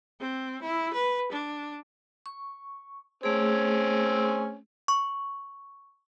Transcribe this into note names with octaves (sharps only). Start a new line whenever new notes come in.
C4
E4
B4
D4
C#6
A3 C4 C#4 G#4
C#6